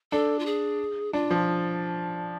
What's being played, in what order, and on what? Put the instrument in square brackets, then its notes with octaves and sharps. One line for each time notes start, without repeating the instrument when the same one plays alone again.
[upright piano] D4 [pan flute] A4
[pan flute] F4
G#4
[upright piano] D4 [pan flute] F4
[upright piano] F3